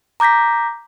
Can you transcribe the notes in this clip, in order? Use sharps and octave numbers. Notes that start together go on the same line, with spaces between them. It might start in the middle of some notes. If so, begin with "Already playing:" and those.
A#5 D6 G6 A#6 B6